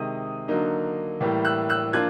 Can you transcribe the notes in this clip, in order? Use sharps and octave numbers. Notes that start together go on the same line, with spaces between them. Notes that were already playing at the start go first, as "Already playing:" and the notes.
Already playing: C3 D#3 G#3 D#6
D3 F#3 A#3 D#4
A2 E3 G3 A#3
E6 F#6
E6 F#6
F3 A#3 D4 F4 F#6 G#6